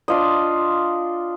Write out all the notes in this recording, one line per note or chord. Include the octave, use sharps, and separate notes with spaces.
D4 F4 D#5